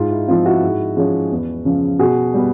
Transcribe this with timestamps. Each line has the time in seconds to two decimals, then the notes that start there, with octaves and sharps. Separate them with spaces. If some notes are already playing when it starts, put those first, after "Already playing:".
Already playing: G#2 F4
0.11 E4
0.28 F3 G#3 C4 F4
0.45 E4 F#4
0.63 G#2
0.97 F3 G#3 C#4
1.31 E2
1.65 C#3 F3
1.99 B2 F#4 G#4
2.34 G3 B3